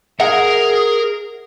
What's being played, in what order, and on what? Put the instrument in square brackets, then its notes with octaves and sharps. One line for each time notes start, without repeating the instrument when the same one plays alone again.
[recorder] G#4 [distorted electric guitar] A#4 A#5 [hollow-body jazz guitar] E5 F#5